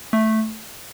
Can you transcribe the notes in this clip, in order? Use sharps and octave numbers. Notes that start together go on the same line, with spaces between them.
A3